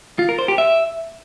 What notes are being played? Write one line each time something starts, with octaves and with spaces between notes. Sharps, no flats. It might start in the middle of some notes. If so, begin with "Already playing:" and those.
F4
A#4
C5
G4
E5